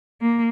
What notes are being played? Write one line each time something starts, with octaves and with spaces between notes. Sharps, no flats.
A#3